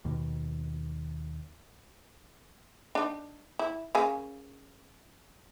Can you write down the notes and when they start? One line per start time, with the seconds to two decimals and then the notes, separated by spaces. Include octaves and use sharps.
0.05 D#2 B2 D#3
2.95 D4 D#4
3.59 E4
3.95 C#3 A#3 G#5